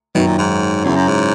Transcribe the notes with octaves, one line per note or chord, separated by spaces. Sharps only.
F#2 B2 D#3 F#3
A#2
G#2
E2 C#3 F#3 C#4 E4
F#2
G#2